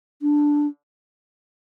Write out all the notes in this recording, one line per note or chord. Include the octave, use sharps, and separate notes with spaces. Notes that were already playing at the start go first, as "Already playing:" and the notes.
D4